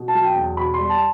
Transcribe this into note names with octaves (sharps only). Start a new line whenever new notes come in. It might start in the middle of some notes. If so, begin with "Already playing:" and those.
Already playing: B2
A5
F#3
G5
E2
B2 B5
G3 C6
A5